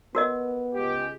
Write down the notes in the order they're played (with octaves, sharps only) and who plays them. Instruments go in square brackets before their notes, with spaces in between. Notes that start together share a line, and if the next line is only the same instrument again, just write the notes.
[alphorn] B3 [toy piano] F#4 A#4 D#5
[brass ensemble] C#2 G#3 G4